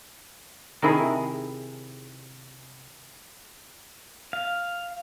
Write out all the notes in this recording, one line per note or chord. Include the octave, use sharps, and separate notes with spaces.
C3 D#3 E4 G#4
F5